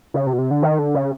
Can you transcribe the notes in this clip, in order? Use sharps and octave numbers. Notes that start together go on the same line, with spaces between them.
C#3
C3
B2
C3
D3
D#3
D3
C#3